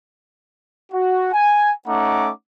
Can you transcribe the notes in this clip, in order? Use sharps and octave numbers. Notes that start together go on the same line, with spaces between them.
F#4
G#5
A3 C#4 D#4 F#5 A#5 D6